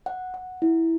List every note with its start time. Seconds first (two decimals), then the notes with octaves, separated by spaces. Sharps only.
0.06 F#5
0.34 F#5
0.62 E4